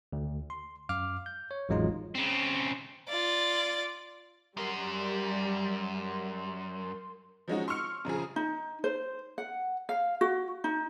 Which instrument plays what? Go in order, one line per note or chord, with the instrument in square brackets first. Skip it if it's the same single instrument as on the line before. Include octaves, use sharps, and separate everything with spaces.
[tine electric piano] D2
C6
F#2 F5 D6 F6
G6
C#5
A1 F2 F#3 G#3 D#4 F4
[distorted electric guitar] C#3 C4
[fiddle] F4 D5
[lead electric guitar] F#2 [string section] G3 [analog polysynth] A#4 C6
[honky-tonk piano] F3 F#3 G#3 C#4 D#4 F#4
C6 C#6 E6 F6 C#7
F#2 C#3 F3 G#4
[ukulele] D#4
C5
F#5
F5
F#4
D#4